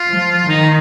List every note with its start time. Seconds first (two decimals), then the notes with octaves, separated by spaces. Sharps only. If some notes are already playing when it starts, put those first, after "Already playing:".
Already playing: F4
0.09 F3
0.49 D#3 D#4